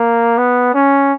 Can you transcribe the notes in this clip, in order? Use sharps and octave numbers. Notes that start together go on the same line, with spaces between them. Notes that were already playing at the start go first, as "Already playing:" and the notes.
Already playing: A#3
B3
C#4